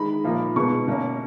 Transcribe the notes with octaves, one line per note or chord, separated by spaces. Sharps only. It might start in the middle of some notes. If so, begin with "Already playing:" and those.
Already playing: D#3 G#3 D#4 B5
A#2 F3 A#3 D#4
B2 G#3 B3 D#4 C#6
B2 A#3 C#4